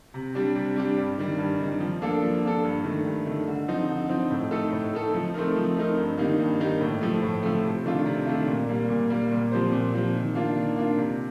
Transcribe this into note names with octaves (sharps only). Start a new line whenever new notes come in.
C3
G3 D4 G4
C3
G3 D4 G4
G2
D#3 G3
G2
D#3 G3
F3
A#3 D4 A4
F3
A#3 D4 A4
G2
D#3 A3
G2
D#3 A3
D3
F3 C4 D#4
D3
F3 C4 D#4
A2
A3 D#4 A4
A2
A3 D#4 A4
F3
A3 C4 D#4 A#4
F3
A3 C4 D#4 A#4
G2
D#3 A#3 D#4 G4
G2
D#3 A#3 D#4 G4
A2
F3 A3
A2
F3 A3
C3
D#3 A3 D4 F4
C3
D#3 A3 D4 F4
A#2
G3 A#3
A#2
G3 A#3
A#2
F3 C4 G4 C5
A#2
F3 C4 G4 C5
D#3
A#3 D4 F4
D#3
A#3 D4 F4
C3